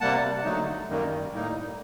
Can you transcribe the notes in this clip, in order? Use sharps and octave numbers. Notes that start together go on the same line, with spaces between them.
C3 G3 A#3 F#5 A5
D3 F#3 A3 D#4
F#2 D#3 G3 A#3
A2 G3 A#3 D#4